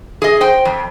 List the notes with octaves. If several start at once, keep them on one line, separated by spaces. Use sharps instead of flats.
G#4 D#5
C5 G5
F2